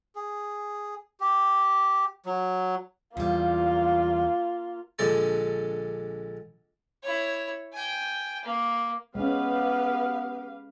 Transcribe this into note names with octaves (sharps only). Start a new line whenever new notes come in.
G#4
G4
F#3
E2 G3 A#3 F4
A#1 D3 G#3 D5
E4 C#5
G5 G#5
A#3
G#3 B3 C#4 G4 B4 F5